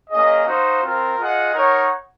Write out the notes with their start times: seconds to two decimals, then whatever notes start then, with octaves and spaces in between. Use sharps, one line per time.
0.10 A#3 C#4 G#4 D#5
0.46 D#4 F#4 C5 F5
0.82 C4 F4 A#4
1.18 F4 G#4 D#5 F#5
1.54 D#4 A#4 C#5 F#5